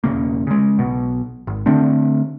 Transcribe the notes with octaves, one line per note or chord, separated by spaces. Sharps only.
E1 E2 C#3 A#3
C#3 G#3
B1 B2
G#1
D3 A3 C4 D4